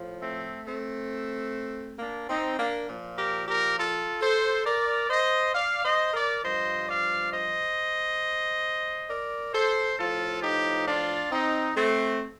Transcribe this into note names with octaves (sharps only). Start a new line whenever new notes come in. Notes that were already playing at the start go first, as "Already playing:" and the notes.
Already playing: A2 F3
A3 C4
A3 C4
A#3 D4
C4 D#4
A#3 D4
A#2 F3
G4 A#4
G4 A#4
F4 A4
A4 C5
A#4 D5
C5 D#5
D5 F5
C5 D#5
A#4 D5
G2 F3 C5 D#5
D5 F5
C5 D#5
A#4 D5
A4 C5
A2 F3 F4 A4
D#4 G4
D4 F4
C4 D#4
A3 C4